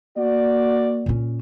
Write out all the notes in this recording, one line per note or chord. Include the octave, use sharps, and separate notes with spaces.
A#3 F#4 D5
A#2 C#4